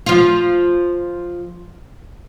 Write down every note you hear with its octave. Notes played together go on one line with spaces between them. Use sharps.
F3 F4